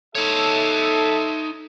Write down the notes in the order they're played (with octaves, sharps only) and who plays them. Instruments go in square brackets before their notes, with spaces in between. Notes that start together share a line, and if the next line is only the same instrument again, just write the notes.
[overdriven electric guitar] D#4 C#5 [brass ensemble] A4 E5